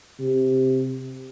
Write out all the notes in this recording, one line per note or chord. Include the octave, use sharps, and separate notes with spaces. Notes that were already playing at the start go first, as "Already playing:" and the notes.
C3